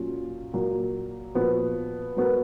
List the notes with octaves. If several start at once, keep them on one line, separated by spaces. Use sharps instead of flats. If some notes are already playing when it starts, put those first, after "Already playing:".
Already playing: A#2 F#3 C#4 F4
A#2 F#3 A#3
A#2 F3 B3 F#4
F#3 B3 F#4 A#4